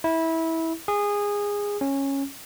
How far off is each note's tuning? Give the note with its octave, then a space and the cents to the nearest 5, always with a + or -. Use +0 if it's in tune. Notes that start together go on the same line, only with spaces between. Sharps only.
E4 -20
G#4 -20
C#4 -15